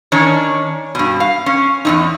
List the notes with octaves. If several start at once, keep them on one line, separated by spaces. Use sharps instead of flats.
D#3 C#4 D4 C#5
G2 B2
F5
C#4
E2 C3 D#4